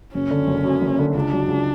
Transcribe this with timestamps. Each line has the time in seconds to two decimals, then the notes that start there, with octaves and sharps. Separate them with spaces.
0.14 F#1 C#4
0.31 D3
0.47 F#1
0.64 F#2
0.82 F#1
0.99 D3
1.15 C#2 D4
1.33 F#3
1.49 C#2